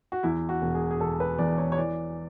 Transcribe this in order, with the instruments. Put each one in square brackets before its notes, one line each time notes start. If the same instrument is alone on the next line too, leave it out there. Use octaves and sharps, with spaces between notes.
[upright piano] F#4
E2 E4
F#4
E1
G#4
G#4
E1 A4
B4
E2 D5
C#5
C#5
E3 D5